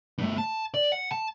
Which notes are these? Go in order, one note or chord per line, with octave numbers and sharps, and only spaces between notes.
G2 A3
A5
D5
F#5
A5